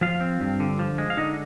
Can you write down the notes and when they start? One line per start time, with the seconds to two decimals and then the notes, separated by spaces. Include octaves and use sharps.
0.01 F3 F4 F5
0.21 C4
0.41 G2
0.60 D3
0.79 F3
0.98 G#3
1.10 F5
1.17 D3 D#4 D#5